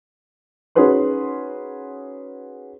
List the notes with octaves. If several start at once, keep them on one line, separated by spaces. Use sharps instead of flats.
C#4 D#4 F#4 G#4 B4 C6